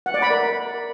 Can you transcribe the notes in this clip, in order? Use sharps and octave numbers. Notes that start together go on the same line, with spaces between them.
F#5
D5
B5
A#4